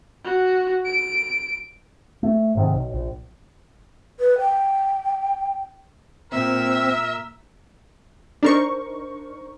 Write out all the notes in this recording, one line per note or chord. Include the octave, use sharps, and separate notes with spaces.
F#4
D7
A3
G#2 C3 D#3
B1
A#1
B4
G5
A#2 C4 A#4 E5
D4 D#4 A#4 C5 C#6